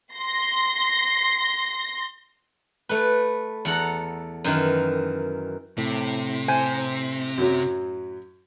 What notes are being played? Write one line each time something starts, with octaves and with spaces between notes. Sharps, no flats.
C6 A#6
A3 A4 B4
E2 A4 F#5 A#5
F#2 D#3 E3
A2 C3
C5 G#5
F#2 F#3